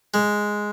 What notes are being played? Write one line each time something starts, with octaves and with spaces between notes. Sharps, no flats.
G#3